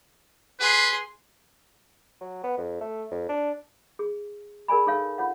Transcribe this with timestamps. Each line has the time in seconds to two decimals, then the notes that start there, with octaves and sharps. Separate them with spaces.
0.60 G#4 B4 C6
2.21 F#3
2.44 B3
2.58 F2
2.81 A3
3.11 F2
3.29 D4
3.99 G#4
4.68 G#4 A#4 D5 G#5 B5
4.87 D#4 G#4 A4 C#5 F5
5.18 F4 C#5 F#5